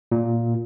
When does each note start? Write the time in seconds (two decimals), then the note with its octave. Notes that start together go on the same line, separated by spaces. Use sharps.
0.12 A#2